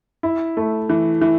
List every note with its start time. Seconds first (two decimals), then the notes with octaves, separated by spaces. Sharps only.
0.23 E4
0.57 A3
0.89 E3
1.21 E3